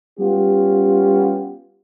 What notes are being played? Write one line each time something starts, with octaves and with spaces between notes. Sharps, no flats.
G3 B3 C#4 F4 G4